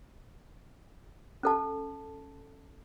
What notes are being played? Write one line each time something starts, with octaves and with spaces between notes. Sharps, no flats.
C#4 A4 A5